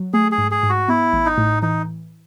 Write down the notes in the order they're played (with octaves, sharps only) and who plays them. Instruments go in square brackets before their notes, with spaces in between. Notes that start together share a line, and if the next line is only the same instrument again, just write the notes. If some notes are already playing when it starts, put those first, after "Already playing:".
Already playing: [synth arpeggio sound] F#3
[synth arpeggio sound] A3 [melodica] G#4
[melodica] G#4
[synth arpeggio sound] G#2
[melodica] G#4
[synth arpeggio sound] G#2
[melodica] F#4
[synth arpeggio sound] B3 [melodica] E4
[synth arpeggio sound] A1
[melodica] D#4
[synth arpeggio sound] A2
[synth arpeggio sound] E3 [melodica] D#4